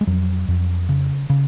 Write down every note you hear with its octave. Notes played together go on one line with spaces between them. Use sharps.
G#3
F2 F#3
F2
C#3
C#3